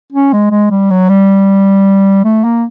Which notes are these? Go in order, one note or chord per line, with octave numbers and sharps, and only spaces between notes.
C#4
G#3
G#3
G3
F#3
G3
A3
A#3